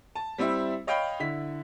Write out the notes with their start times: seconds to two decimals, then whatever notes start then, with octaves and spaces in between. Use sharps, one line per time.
0.15 A5
0.38 G3 C4 E4 E5
0.87 C#5 D#5 F5 G5 B5
1.20 D3 E4 B6